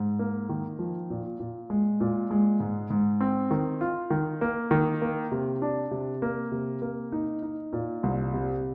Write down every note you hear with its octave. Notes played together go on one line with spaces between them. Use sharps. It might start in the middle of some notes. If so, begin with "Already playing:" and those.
Already playing: G#2
A#3
D#3
F3
A#2
A#2
G#3
A#2
G#3
G#2
G#2
C4
D#3
F4
D#3
A#3
D#3
A#3
C3
D4
C3
A#3
C3
A#3
D#4
D#4
A#2
C2
C3